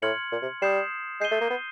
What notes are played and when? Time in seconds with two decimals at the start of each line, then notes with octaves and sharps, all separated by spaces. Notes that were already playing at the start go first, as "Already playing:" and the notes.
0.02 A2 C6 F6 G#6 C#7 F#7
0.32 A#2
0.42 C3
0.62 G3 D#6 G6 C7 E7
1.21 G#3 G6 C7 D#7 G7
1.31 A3
1.41 A#3
1.50 B3